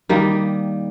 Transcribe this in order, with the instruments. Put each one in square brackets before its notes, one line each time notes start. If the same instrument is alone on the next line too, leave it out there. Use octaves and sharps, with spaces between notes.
[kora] D#3 G3 A#3 D#4